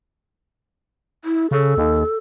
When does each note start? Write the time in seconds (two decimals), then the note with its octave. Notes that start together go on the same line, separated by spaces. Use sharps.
1.25 E4
1.51 C#3 A4
1.77 D#2